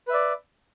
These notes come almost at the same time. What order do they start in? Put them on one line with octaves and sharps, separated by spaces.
B4 E5 D5